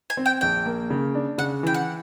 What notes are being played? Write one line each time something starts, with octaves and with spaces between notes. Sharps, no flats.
G#5
C4
G5
A#1 G5
A#3
C#3
D4
C#3 F#5
E3 G5
F#5